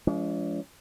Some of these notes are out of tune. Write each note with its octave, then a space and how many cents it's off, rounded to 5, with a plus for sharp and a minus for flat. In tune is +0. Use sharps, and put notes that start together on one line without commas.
F3 -35 G#3 +0 C#4 +45